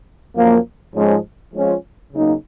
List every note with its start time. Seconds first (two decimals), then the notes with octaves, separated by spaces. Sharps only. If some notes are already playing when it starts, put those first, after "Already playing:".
0.36 F#2 F3 A#3
0.95 G#2 F3 G#3 C#4
1.54 F3 G#3 C#4 F4
2.12 C#3 F#3 A#3 D#4